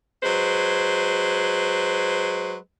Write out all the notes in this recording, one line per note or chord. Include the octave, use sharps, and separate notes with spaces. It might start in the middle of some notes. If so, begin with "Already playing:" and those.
F#3 G#3 B4 C5